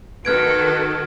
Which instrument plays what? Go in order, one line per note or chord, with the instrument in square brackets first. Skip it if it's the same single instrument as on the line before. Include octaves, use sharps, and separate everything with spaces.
[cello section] D#3 F#4 A4 [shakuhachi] B4 [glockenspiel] F6 G#6 D7